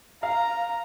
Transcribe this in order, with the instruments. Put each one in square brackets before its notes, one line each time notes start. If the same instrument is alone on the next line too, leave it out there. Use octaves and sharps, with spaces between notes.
[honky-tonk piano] F5 [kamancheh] A#5